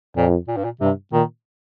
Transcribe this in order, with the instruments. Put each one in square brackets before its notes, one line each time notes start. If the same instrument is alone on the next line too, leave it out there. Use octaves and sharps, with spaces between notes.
[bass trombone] F2 [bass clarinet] A#2
[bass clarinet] A#2
G2
A#2
[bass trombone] G2 [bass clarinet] C3
[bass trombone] A#2 [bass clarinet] D#3